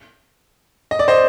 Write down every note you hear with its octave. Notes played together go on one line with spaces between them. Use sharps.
D#5
D5
C5 D#5